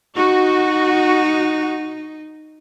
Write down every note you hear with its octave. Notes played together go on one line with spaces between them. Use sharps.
D#4 F#4